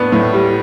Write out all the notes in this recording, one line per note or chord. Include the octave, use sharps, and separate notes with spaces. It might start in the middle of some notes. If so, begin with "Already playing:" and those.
Already playing: A2 B3 D4
A2
G3